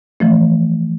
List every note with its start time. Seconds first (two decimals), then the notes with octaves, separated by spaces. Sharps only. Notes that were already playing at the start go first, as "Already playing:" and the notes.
0.20 E3 F3 A3